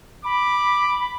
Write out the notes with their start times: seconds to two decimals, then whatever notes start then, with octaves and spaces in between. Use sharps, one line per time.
0.25 B5 D6